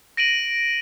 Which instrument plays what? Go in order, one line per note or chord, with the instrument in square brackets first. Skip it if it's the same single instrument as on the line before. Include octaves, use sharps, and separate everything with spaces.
[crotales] A#6 D7 D#7 F#7